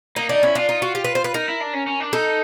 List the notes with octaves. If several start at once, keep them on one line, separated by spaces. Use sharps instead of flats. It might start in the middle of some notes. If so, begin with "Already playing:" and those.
A#3 D#4
D4 D#4
C#4 E4
D4 F4
D#4
F#4
G4
B4
C5
B4
D#4 A#4
E4
D4
C#4
C#4
D4
D#4 A4